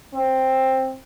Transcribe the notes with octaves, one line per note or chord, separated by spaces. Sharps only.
C4